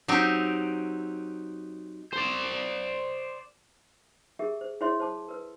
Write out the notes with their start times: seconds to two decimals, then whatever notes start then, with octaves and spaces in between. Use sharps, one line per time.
0.08 F#3 C4 D#4 G4
2.13 C5 D5
4.39 G4 G#4 A#4 E5
4.61 C5
4.81 E4 G#4 C5 C#5 E5 C6
5.00 C5 A5 D6
5.29 A#4 B4